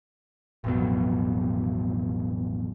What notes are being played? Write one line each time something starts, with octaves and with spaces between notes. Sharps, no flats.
A1 F2 B2 F#3